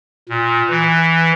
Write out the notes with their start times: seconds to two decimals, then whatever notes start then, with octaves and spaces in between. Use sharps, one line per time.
0.29 A#2
0.70 E3